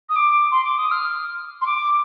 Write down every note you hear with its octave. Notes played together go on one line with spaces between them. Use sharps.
D#6
D6
C6
D6
D#6
F6
C6
D6